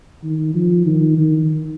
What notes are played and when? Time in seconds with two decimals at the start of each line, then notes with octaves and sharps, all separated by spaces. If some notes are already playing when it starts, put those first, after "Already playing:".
0.23 D#3
0.54 F3
0.86 D#3
1.17 D#3